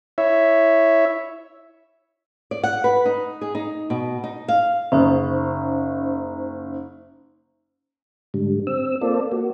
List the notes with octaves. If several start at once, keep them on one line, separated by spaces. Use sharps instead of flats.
E4 C#5 E5
D5
F#5
B4
D#4
G#4
D#4
B2
D#4
F5
F#1 C#4 D#4 C5
G#2 D3 G3
C4 E6
A#3 C4 F4 A4 D5
A#3 F#4